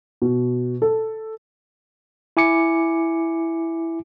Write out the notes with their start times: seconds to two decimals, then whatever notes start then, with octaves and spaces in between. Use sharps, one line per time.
0.22 B2
0.82 A4
2.37 E4 G#5 D6 C#7